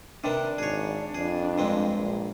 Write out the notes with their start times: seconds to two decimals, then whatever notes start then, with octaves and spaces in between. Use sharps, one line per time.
0.24 C3 D#3 B3 D4
0.58 G#1 G#4 C#5
1.15 F2 G#4
1.58 G2 G#3 C4
1.97 A#1